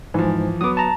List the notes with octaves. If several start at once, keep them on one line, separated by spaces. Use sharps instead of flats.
G#2 E3 F3
F#3 B3 D6 D#6
A5 A#5